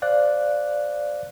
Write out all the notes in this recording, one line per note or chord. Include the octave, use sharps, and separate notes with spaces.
C5 D5 F5 F#6